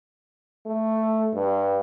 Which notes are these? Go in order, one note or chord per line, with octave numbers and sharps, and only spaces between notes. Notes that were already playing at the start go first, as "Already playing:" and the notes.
A3
G2